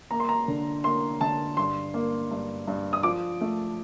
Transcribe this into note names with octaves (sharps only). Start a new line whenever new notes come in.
A#3 A#5
C6
A#5
D3
A#3 C6
D3 A5
G2 C6
A#3
G2
G2
D#6
F3 D6
A3